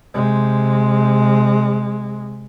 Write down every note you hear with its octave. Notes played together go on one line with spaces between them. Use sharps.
C3 G#3